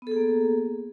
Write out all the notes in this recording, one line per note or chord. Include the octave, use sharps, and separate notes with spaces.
A#3 B3 G#4 A4